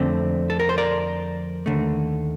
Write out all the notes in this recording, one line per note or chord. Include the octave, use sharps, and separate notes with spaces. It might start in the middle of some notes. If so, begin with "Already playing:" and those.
Already playing: F2 D3 A3 C4
A4
A#4
C5
A#4 D5
D#2 D3 A3